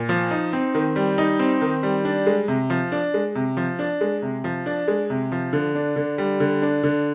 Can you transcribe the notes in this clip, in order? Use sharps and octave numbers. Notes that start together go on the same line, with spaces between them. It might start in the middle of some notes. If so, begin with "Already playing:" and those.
Already playing: A#2
F3
D#4
C4
D#3
G3
D#4
C4
D#3
G3
D4
G#3
C3
F3
D4
G#3
C3
F3
D4
G#3
C3
F3
D4
G#3
C3
F3
D3
D4
D3
G3
D3
D4
D3